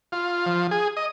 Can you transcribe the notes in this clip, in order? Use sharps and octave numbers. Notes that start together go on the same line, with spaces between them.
F4
F3
G#4
D#5